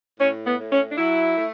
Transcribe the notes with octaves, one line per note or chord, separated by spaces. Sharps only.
A2 C#4
B3
A2
C#4
D4
F#3 E4
A3